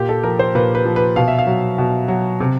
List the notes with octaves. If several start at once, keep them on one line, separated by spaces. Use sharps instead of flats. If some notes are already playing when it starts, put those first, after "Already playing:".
Already playing: A#2 G4
A4
F3 A#4
C5
A#2 B4
B4
F3
B4
B2 F5
E5
F5
F#3
B2
F#3
C3